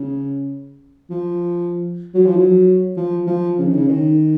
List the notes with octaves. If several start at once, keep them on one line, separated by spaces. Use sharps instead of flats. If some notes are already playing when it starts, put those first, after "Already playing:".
Already playing: C#3
F3
F#3
F3
F#3
F3
F3
C#3
D#3
C#3
D#3